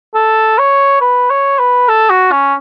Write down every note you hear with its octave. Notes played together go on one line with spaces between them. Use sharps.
A4
C#5
B4
C#5
B4
A4
F#4
C#4